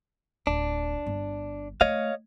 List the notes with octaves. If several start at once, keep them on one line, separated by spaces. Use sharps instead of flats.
D1 D4
G1
A3 C#5 D#5 F5